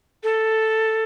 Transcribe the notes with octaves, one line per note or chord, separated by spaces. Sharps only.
A4